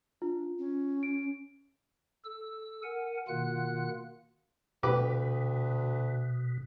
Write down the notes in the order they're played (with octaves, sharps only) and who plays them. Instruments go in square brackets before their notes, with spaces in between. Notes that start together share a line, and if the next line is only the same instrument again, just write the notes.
[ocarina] D4 [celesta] F4
[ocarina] C#4
[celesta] D7
[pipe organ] A4 E6
A#4 F#5 G#5
B2 D#3 A#3 F4 F#5 F#6
[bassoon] D2 [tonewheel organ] B2 [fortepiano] G4 B4 D6